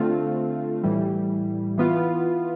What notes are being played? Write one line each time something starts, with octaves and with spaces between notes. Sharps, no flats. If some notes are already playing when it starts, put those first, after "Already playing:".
Already playing: D3 A3 C4 F4
A2 E3 G3
E3 B3 F4